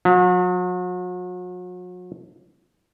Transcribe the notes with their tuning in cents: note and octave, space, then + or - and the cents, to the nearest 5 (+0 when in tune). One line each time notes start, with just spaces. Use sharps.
F#3 -40